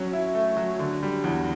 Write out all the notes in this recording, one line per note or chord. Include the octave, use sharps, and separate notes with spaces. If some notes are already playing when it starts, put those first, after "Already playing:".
Already playing: F#3 C#4
E4
A3
F#3
D3
G3
E2